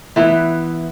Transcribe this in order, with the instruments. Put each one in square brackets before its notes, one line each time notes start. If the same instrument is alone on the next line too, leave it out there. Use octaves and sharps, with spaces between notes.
[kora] E3 B3 E4